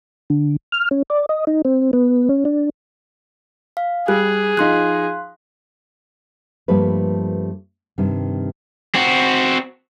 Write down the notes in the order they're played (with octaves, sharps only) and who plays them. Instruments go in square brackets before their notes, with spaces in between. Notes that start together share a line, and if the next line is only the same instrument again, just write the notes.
[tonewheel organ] D3
F6
C#4
D5
D#5
D#4
C4
B3
C#4
D4
[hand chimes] F5
[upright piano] G3 [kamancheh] G#4 [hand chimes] F#6
[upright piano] F3 D#4 [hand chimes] F5 C6 F#6
[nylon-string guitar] G2 F3 G3 A3 A#3 B4
G2 C3 D#3
[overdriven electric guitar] C4 F#4